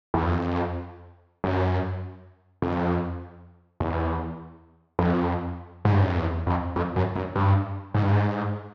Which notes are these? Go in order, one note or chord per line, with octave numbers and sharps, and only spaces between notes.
E2
F2
F#2
F2
E2
F2
G#2
G2
F#2
F2
E2
F2
F2
F#2
F#2
G2
G#2
G2
G#2